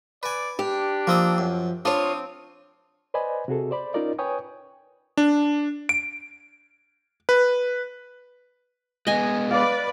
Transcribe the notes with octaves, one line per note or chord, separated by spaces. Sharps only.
B4 D5 G#5
D4 G4
F3 A#3 C4 D#6
F#2 F3
C4 D4 F4 C#5 D#6
B4 C5 D5 D#5 G#5 B5
C3 F#4 G#4 A4
C5 D5 B5
C#4 D#4 F4 A#4 D5 D#5
B4 C#5 G5 G#5 C#6 D#6
D4
D7
B4
G#3 B3 D#5 G#5
B4 D5 F5